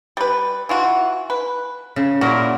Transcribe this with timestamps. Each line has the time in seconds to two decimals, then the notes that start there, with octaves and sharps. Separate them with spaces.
0.17 G3 B4
0.69 E3 F4 F#4
1.30 B4
1.96 C#3
2.21 A#2 E4 F#4 A#4